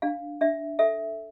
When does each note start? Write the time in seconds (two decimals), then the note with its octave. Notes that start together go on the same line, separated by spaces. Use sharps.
0.02 D4 F5
0.41 D4 E5
0.79 A4 E5